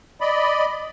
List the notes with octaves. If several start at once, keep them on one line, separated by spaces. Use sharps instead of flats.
D5 D#5 B5